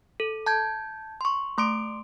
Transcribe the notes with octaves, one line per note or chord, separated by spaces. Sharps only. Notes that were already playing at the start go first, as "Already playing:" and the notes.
A4
A5 G6 G#6
C6 C#6
A3 C6 D6 D7